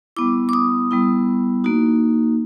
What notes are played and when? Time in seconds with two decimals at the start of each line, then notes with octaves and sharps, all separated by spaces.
0.17 G3 B3 E4 D6
0.49 D6
0.53 D#6
0.91 G3 B3 E4
1.64 A#3 D#4 F#4